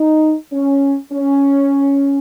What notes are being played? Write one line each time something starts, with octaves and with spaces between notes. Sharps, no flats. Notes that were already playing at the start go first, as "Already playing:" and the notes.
Already playing: D#4
C#4
C#4